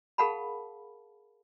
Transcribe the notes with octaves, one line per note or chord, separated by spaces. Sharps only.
G#4 A#4 F5 F#5 A5 B5